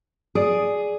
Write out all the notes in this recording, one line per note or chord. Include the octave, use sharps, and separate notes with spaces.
G#4 D5 D#6